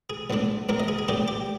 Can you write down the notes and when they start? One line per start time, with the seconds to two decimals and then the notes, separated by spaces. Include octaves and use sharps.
0.10 G#4
0.30 A#1 A#2 G#3 D4
0.69 A#1 A#2 G#3 D4 A#4
0.80 D#5
0.88 G#4
0.99 G#4
1.08 A#1 A#2 G#3 D4 G4
1.28 G4